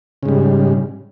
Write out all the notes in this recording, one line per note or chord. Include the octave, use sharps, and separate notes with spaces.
G#2 C#3 G3